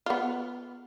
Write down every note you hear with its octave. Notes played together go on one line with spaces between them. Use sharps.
B3 F4